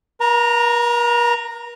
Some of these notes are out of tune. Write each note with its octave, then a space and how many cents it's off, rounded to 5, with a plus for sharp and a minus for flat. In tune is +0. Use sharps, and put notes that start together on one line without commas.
A#4 +45 A#5 -10